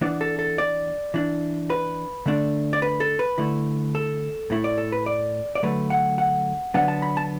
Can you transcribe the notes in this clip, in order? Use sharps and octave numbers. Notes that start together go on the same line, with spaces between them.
E3 B3 D4 D5
A4
A4
D5
E3 D4
B4
D3 A3 D4
D5
B4
A4
B4
D3 A3 E4
A4
A2 A3 E4
D5
A4
B4
D5
D5
D3 F#3 A3 B4
F#5
F#5
D3 F#3 B3 D4 F#5
A5
B5
A5